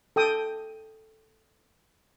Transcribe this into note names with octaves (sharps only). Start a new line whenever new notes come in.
A4 G5 D#6